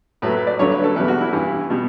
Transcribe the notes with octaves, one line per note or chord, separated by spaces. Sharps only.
A2 F#3 A3 B4
B4
D5
G2 D3 F#3 A3 C#5
B4
A4
E2 B2 G3 B4
F#4
E4
G2 E3 G3 E4
B2 G3